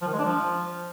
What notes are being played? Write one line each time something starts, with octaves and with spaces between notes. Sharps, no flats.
F3
D#3
G#3
D4
F3